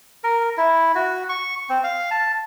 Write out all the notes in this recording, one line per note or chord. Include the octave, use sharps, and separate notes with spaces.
A#4
E4
F#4
C#6
C4
F5
A5